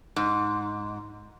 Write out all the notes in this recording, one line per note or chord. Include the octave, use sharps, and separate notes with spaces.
G#2